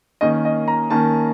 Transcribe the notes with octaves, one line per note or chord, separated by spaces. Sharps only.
D#3 A#3 C#4 D#5
D#5
A#5
D#3 A#3 C#4 A5